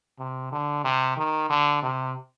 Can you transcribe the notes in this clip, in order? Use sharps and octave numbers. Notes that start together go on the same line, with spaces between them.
C3
D3
C3
D#3
D3
C3